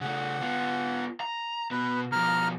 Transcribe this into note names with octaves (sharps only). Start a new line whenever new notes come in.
C#3 A3 F#5
B3 F4
A#5
B2 B3 B4
B2 F3 A#5 F6